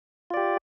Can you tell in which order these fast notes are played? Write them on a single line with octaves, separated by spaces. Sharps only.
F4 D5 G4